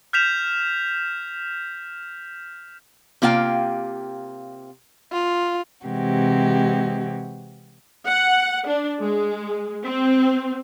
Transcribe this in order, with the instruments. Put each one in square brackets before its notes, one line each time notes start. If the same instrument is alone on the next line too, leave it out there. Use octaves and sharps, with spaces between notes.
[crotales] F6 G6 B6 E7 F7
[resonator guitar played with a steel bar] C3 A#3 F4 F5 G5
[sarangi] F4
[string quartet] C3 E3 G#3 C4 F#4 G4
[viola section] F#5
D4
G#3
C4